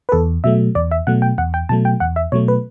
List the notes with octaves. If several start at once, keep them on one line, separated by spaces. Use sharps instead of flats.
B4
E2 A4
B2 F#3 A3 E5
E2 D5
E5
B2 F#3 A3 F#5
G5
E2 F#5
G5
B2 F#3 A3 A5
G5
E2 F#5
E5
B2 F#3 A3 C#5
B4